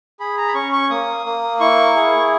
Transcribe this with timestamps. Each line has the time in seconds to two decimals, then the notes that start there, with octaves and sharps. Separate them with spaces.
0.20 G#4 B5
0.38 A#5
0.48 B5
0.54 C#4 C#6
0.72 C#6
0.90 A#3 D#6
1.26 A#3
1.60 E4 C#6
1.96 G#4